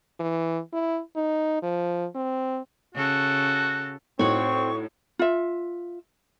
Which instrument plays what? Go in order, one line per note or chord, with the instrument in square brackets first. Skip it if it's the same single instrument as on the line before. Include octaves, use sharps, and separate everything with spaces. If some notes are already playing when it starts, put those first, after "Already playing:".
[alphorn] E3
E4
D#4
F3
C4
[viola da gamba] C#3 A4 [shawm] F#4
[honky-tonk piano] A2 D#4 [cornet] C4 [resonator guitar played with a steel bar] F#4 C#5 [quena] C#6
[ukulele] F4 E5